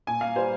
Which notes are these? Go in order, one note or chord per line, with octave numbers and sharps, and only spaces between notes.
A#2 G#5
A#3 F5
G3 C5